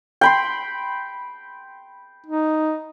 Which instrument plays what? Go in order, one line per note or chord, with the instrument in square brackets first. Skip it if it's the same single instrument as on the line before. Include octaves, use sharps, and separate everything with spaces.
[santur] G5 B5 C6
[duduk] D#4